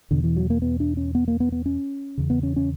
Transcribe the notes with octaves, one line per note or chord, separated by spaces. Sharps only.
E2 B2 D3
E3
F#3
A#3
B3
D4
C#4
B3
A#3
B3
B3
C#4
E2 C#3
B3
C#4
C#4